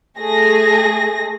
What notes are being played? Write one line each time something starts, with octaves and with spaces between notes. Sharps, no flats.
A3 G#4 A#6